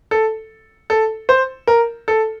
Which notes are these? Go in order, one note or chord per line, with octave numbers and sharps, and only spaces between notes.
A4
A4
C5
A#4
A4